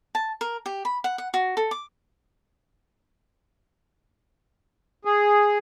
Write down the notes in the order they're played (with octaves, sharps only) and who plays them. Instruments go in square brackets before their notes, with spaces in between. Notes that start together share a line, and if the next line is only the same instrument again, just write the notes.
[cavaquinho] A5
A#4
G4
B5
F#5
F#5
F#4
A4
D6
[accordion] G#4